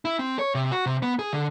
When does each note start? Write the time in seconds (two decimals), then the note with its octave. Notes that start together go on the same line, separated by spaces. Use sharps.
0.05 E4
0.19 C4
0.39 C#5
0.55 C3
0.72 F#4
0.86 C3
1.02 B3
1.19 G#4
1.33 D3